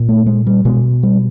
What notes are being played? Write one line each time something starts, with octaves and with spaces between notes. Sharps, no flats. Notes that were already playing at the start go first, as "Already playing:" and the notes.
Already playing: A#2
A3
G#3
G3
B2 G#3
G3